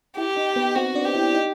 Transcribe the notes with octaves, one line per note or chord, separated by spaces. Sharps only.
E4 G4 E5
D#4 D#5
B3 B4
C4 F#4 C5
D4 D5
G4
E4 E5
D#4 D#5